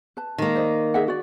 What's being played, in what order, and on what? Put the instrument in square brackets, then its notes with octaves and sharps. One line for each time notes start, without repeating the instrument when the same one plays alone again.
[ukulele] B4 A5
[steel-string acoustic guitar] D#3 A#3
[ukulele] C5 D5 D#5
G#4 E5 F#5
F#4 D5